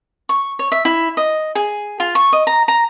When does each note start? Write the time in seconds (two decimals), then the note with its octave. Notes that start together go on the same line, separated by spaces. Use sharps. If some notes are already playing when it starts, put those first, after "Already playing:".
0.29 C#6
0.59 C#5
0.72 E5
0.85 E4
1.17 D#5
1.55 G#4
2.00 F4
2.15 C#6
2.33 D#5
2.47 A#5
2.68 A#5